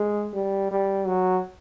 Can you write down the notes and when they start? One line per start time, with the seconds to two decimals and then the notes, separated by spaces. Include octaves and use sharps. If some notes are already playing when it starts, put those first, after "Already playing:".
Already playing: G#3
0.34 G3
0.71 G3
1.07 F#3